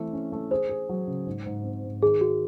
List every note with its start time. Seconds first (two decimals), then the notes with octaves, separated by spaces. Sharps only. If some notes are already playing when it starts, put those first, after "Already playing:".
Already playing: E3 A3 C4
0.13 C#4
0.32 A3
0.51 G#4 C5
0.69 G#4
0.89 F#3
1.07 C#3
1.26 G#2
1.46 G#2
1.64 C4
1.84 G#2
2.03 D#3 G#4
2.21 D#3 F#4